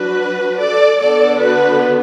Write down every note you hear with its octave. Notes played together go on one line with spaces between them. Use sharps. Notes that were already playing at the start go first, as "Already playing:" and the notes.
Already playing: F#3 D4 F#4 B4
A4 D5
D3 B3 D4 A4 D5
F#4 B4